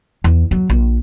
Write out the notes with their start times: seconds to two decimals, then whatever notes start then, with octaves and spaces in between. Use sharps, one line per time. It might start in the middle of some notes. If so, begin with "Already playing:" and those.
0.24 E2
0.51 F#3
0.70 A#1